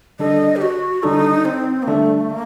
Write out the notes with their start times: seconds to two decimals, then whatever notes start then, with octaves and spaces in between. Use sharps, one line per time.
0.19 D3 G3 D4 A4 D#5
0.56 G4
0.62 F#4
1.03 D3 G3 D4 D#4 A4
1.45 C4
1.83 A#3
1.87 D3 G3 A3 D4 A4
2.30 A#3